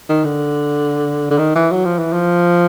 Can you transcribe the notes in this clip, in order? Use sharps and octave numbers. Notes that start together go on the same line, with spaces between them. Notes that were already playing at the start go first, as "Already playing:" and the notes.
D#3
D3
D3
D#3
E3
F#3
F3
E3
F3